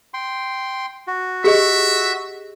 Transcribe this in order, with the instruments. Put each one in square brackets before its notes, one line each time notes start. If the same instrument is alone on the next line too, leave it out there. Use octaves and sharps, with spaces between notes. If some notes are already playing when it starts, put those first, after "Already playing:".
[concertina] G5 C6
F#4
[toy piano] G4 G#4 D#5 [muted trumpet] E5